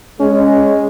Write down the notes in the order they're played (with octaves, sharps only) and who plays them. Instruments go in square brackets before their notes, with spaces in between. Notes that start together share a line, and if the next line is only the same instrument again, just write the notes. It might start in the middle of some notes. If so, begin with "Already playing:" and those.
[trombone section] G#3 [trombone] C#4